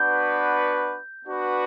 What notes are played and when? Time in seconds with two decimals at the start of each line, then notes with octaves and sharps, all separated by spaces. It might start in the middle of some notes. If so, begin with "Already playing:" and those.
Already playing: B3 D4 F#4 B4 G6
1.25 B3 D4 F#4 B4